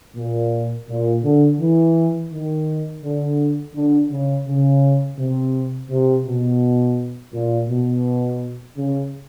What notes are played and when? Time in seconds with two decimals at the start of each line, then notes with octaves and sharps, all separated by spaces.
0.16 A#2
0.88 A#2
1.23 D3
1.60 E3
2.32 D#3
3.02 D3
3.75 D3
4.10 C#3
4.47 C#3
5.18 C3
5.91 C3
6.26 B2
7.34 A#2
7.69 B2
8.77 C#3